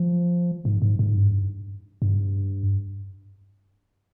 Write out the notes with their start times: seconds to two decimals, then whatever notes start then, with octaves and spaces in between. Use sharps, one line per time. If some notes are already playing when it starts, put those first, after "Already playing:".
Already playing: F3
0.65 G#2
0.82 G#2
0.99 G#2
1.16 G2
2.02 G2